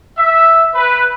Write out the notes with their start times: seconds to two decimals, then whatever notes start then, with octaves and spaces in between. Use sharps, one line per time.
0.18 E5
0.75 B4